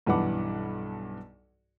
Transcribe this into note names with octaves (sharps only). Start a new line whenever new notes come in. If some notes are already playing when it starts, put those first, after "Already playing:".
B1 G2 E3 B4 F#5 D6